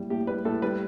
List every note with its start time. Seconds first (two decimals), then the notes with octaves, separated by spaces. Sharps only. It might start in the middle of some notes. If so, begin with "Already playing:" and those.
Already playing: A2 G3
0.10 A2 G4
0.27 G3 B4
0.45 A2 A4
0.62 G3 B4